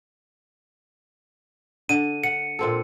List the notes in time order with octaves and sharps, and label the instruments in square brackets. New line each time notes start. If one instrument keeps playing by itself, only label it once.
[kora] D3 [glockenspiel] D#7
[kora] F#5 [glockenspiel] C#7
[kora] A#2 C4 A4